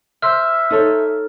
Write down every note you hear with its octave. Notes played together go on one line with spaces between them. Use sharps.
C5 E5 F6
D#4 A4 C#5